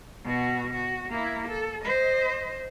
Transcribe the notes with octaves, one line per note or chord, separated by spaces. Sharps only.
B2 F#4
F#4
A#3 E4
A4
C5 D#5